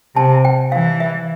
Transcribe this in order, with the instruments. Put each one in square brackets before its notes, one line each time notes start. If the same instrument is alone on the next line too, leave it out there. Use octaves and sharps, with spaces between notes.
[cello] C3 [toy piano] A5
[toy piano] G5
[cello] E3 [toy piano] F5
[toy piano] E5